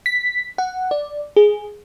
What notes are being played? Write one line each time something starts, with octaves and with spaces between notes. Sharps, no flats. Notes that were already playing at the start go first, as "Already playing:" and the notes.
B6
F#5
D5
G#4